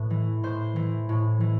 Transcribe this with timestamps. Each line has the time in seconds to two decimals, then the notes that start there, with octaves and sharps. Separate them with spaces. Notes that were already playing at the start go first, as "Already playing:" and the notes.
Already playing: A2 B4
0.10 E3
0.43 A2 C5
0.76 E3
1.09 A2
1.41 E3